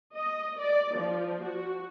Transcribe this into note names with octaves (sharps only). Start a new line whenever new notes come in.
D#5
D5
F3
F#4